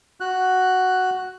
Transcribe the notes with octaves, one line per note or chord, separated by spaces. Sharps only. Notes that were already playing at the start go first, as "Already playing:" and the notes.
F#4 F#6